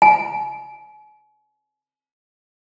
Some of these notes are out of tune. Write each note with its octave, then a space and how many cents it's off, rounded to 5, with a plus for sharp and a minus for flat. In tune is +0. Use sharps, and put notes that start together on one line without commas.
G#5 +40